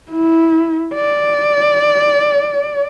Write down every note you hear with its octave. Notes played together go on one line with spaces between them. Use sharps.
E4
D5